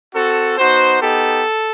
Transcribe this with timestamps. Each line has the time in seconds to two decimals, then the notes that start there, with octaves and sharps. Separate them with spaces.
0.15 C4 F#4 A4
0.58 B3 D#4 F#4 C5
1.00 B3 D#4 G4 A4